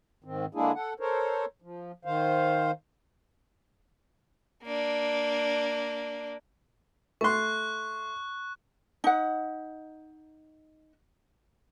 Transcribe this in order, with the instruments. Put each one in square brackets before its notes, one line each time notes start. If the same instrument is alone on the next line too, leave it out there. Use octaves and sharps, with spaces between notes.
[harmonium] G#2 D#3 C4
D3 G#3 A#3 D4 E4 G#4
A4 F#5
A4 A#4 C5 C#5
F3
D#3 C5 F5
[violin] A#3 D4
[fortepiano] A3 C6 [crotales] C#6 F#6
[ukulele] D#4 F#5